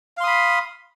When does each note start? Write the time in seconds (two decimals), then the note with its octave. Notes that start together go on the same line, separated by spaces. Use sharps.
0.17 F5
0.21 C6
0.24 D#6
0.27 B5